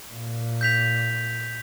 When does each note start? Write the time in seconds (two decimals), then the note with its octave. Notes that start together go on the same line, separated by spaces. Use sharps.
0.13 A#2
0.61 G6 B6 F7